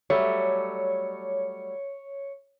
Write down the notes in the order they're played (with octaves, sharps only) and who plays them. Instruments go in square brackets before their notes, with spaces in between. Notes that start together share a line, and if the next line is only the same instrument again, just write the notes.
[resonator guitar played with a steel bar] F#3 G3 A3 [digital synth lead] C#5